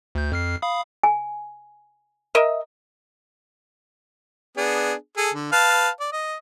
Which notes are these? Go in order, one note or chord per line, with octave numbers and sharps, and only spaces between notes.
D2 G6
F2 F6 C7
F5 B5 D#6
G#5
A#4 D#5 E5
B3 D4 G#4
G#4 A4
D3
B4 F5 A5
D5
D#5